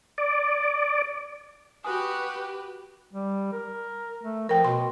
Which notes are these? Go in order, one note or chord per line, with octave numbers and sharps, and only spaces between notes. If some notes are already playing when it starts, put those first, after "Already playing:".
D5
F#4 G4 B4 G#5 D#6
G3
A#4
A3
F3 A#4 G5
B2 C6